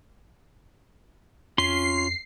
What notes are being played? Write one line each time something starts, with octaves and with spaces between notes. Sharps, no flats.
F2 C#4 F4 C6 C7